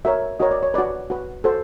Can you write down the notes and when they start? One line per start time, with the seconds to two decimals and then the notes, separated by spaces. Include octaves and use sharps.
0.05 F#4 A#4 C#5 E5
0.39 F#4 A#4 C#5 D#5
0.51 D5
0.63 C#5
0.74 F#4 B4 D5
1.10 F#4 B4
1.44 F#4 A4 C5